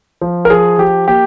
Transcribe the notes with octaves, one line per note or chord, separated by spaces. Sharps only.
F3
A#4
F3 G#4
F3 G4
A#3 G4